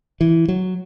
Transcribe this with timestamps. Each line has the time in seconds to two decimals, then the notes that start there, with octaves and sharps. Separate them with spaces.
0.21 E3
0.48 F#3